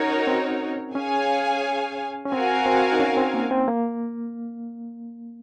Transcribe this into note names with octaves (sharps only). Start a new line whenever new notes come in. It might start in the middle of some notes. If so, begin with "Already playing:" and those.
Already playing: C#4 D#4 F#4 A#4 C#5
C4
C#4 G#4 C#5 F5 G#5
C#4
C4 F#4 A#4 F5 G#5
C4
D#4
C#4
C4
A#3
C4
A#3